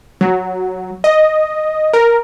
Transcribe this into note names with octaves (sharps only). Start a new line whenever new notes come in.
F#3
D#5
A#4